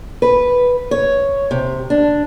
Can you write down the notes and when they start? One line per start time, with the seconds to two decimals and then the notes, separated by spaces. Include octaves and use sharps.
0.22 B4
0.91 C#5
1.51 C3
1.90 D4